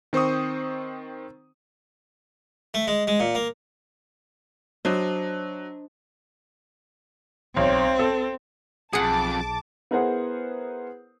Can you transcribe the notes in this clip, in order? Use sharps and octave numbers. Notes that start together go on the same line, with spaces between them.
D#3 C4 C5 C#6 D#6
A3
G#3
G#3
A#2
A#3
F#3 D4 C5 D#5
B1 C4
A4
B1 F2 G#4 F#5 A5 D6
B3 E4 G#4 A#4 C5 F#5